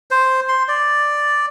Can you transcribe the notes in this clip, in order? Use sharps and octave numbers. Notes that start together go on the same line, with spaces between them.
C5
C6
D5